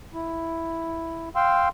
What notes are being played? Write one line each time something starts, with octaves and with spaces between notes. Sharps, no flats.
E4
F5 G5 C6 E6